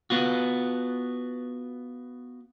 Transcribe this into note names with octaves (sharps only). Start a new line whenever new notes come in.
B3 F4 F#4